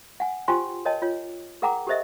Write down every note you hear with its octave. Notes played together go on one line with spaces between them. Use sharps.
F#5 G#5
F4 G4 C5 G5 G#5 C6
A#4 C#5 D#5 G5 A5
F4 C#5
G#4 A#4 F#5 G5 A#5 D6
G4 A4 A#4 C5 D#5 E5